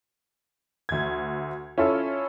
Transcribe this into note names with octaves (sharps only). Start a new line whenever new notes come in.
D2 G#6
C#4 E4 F4 A4